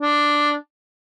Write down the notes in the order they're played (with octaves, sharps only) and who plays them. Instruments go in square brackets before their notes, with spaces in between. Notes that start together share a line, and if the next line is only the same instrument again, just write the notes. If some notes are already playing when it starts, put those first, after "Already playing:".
[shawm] D4